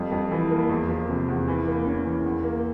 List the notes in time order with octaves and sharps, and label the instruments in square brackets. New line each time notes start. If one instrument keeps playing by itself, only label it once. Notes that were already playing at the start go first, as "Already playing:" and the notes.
Already playing: [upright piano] F2 G3
F2
E3
A#3
E2
F3
C3
E2
E3
A#3
C#4
E3
E2
A#3